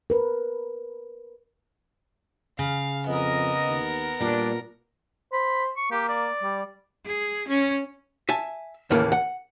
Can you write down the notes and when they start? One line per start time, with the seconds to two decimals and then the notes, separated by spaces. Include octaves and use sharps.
0.10 A#4 B4
2.59 C#3 F5
3.07 F2 B3 A#4 D#5
3.68 D#2
4.21 A#2 G3 D4 D5
5.33 C5 B5
5.77 C#6
5.91 A#3 G4
6.09 D5
6.43 G3
7.05 G#4
7.48 C#4
8.29 E5 G#5 A5
8.90 D#2 A2 C#3 E3 A#3
9.12 F#5